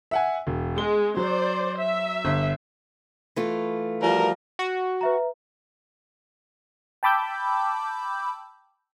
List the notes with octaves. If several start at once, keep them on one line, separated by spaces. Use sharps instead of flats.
E5 F#5 G#5
E1
G#3 G7
F#3 C5 D5
E5
G1
E3 A3 F4
F3 G3 F#4 A#4
F#4
B4 E5 A#5
G5 A5 B5 D6 E6 G6